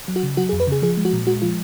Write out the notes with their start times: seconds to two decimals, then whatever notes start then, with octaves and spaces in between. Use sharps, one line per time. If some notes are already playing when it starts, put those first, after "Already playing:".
0.08 F#3
0.16 F#4
0.23 C#3
0.37 F#3 F#4
0.49 G#4
0.53 F2
0.60 B4
0.67 C#3 G#4
0.82 F3 G#4
0.97 G#3
1.05 F#4
1.13 A#2
1.27 G#3 F#4
1.42 F3 F4